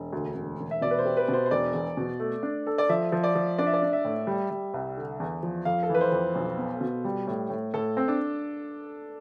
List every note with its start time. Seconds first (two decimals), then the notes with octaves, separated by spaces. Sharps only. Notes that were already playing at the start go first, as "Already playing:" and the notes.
Already playing: E1
0.13 D2
0.36 E1
0.59 E1
0.71 E5
0.81 B2 D5
0.91 B4
0.99 C5
1.05 G4
1.17 B4
1.28 B2 C5
1.46 C5
1.51 E1 D5
1.74 E2
1.97 B2
2.20 A3
2.43 D4
2.67 A4
2.78 D5
2.89 F3 E5
3.12 F3
3.24 D5
3.35 F3
3.58 D4 D5
3.67 E5
3.74 D5
3.82 D4
3.93 E5
4.05 A2
4.27 G3
4.51 G3
4.74 C2
4.97 D3
5.20 E2
5.43 F3
5.65 F2 F5
5.83 A4
5.89 E3
5.95 B4
6.01 C5
6.12 F2
6.35 B1
6.58 B3
6.81 B2
7.04 G3
7.27 A2
7.50 A2
7.74 A2 A4
7.97 C4
8.08 D4